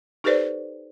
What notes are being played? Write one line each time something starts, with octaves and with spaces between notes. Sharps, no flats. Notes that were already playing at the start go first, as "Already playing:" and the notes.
D#4 G4 A4 B4 C5 D5